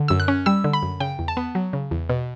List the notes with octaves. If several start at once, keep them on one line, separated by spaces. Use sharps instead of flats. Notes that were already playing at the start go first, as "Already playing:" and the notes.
Already playing: D3
F#2 E6
F#6
C#4
G3 E6
D3
B5
F#2
C#3 G5
E2
A5
B3
F#3
C#3
E2
B2